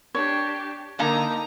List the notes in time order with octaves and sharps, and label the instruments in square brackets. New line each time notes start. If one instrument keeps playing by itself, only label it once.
[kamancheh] D4 G4 [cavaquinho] C#5
[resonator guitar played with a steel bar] D3 A#3 A5 [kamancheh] D#4 A#4 [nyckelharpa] A#5